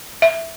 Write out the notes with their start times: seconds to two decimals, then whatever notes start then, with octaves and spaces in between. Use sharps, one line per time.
0.22 E5